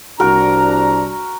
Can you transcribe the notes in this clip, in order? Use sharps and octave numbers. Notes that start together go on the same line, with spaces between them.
C2 D4 F#4 A#4 A#5